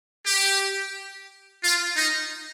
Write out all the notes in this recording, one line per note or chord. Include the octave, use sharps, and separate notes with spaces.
G4
F4
D#4